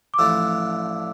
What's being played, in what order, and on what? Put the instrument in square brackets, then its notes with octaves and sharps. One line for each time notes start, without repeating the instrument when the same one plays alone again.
[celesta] D6
[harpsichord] A1 A2 F3 A3 D4 [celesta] E6